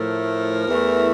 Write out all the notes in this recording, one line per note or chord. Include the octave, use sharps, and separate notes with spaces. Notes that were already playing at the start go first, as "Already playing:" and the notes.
Already playing: A2 F3 A3 A#4
E2 E3 A3